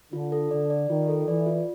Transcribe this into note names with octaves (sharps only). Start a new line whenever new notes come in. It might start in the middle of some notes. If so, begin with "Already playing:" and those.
D3 F4
A4
D3 D5
D5
D#3 F4
A4
E3 D5
F4